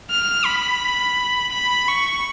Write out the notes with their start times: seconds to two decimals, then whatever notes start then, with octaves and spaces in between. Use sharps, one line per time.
0.11 F6
0.46 B5
1.52 B5
1.89 C#6